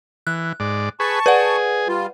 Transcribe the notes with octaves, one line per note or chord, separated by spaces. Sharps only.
E3 F#6
G#2 D5
G#4 B4 A5 C#6
G#4 B4 D5 F#5
G3 F4